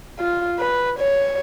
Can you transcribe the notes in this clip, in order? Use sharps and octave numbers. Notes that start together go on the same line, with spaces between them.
F4
B4
C#5